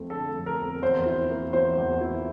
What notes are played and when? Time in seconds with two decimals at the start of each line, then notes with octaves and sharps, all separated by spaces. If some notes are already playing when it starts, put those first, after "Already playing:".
Already playing: F2 A3 C4
0.10 D3 A4
0.34 F2
0.46 A#4
0.59 C4
0.82 E2 C5
1.06 E4
1.30 A#3
1.53 E3 C5
1.78 E2
2.01 E4